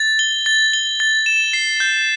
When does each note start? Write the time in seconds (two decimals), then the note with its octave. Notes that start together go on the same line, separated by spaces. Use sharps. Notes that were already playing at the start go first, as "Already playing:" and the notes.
Already playing: A6
0.19 G7
0.46 A6
0.73 G7
1.00 A6
1.26 E7
1.53 C7
1.80 G6